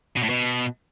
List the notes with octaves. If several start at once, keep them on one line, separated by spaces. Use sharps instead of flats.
B2
A2
B2